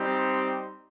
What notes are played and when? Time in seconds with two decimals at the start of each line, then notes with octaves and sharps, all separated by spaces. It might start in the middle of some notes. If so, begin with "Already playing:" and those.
Already playing: G3 C4 D#4 G4
0.17 C6